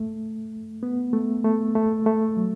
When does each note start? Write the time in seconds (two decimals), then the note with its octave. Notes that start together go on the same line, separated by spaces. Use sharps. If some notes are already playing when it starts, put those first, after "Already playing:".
Already playing: A3
0.83 B3
1.13 A3
1.45 A3
1.75 A3
2.06 A3
2.37 F#3